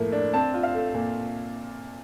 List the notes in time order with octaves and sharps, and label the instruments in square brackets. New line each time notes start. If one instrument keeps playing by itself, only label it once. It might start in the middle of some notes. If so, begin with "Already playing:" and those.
Already playing: [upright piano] A2 F3 A#3
D4
C4 A5
F4
F5
A3
A#2